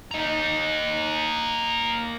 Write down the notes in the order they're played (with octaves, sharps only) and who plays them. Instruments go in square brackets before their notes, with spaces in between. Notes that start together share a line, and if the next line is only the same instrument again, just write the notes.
[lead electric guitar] A#3 D#5